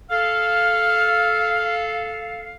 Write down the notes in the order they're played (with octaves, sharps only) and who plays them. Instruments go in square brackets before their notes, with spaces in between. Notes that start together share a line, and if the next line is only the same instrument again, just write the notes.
[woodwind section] A4 F5 [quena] F6